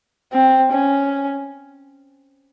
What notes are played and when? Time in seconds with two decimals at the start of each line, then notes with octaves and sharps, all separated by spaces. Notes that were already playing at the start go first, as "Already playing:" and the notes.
0.32 C4
0.72 C#4